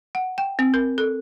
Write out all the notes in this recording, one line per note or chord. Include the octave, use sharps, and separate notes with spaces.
F#5
G5
C4
A#4
A4